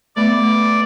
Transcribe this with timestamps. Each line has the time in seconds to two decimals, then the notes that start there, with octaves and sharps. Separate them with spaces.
0.16 A3 B3 D5